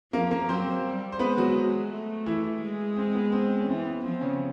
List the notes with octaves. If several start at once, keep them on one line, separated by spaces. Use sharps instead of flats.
F3 A#3 A#4
A#3 A#4
F#3 C4 C5
G3
C5
G#3 B3 B4
F#3 F#4
A3
E3 E4
G#3
C4
B3
C4
C#4
E3 C4
B3
F3 C4
C#3 C#4